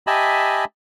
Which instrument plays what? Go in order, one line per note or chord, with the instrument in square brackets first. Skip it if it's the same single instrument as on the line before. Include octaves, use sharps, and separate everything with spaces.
[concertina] G4 D#5 E5 G#5 A5 B5